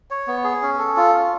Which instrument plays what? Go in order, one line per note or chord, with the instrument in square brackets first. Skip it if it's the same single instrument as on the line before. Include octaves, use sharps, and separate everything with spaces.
[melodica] C#5
B3
G#4
C#4
A4
F4
C#4